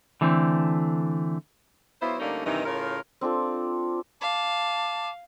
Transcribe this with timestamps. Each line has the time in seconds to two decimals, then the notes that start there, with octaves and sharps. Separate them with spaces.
0.21 D3 E3 A3 C4
2.02 F#3 B3 E4 F4 C5
2.20 D3 G3 A3 A#3 C#4 D#4
2.45 G2 C3 D#3 E3 D#4
2.66 A2 C#3 F4 A#4
3.21 C4 D4 F4 A4
4.21 F5 A5 D6